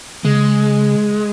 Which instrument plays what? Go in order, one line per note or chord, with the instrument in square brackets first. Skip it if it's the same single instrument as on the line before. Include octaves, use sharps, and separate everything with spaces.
[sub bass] C#3 [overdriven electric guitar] G#3